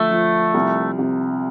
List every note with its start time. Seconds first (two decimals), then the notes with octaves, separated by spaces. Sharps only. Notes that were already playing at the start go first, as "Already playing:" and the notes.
Already playing: D3 F3 A3
0.11 F3
0.54 C2
0.99 C3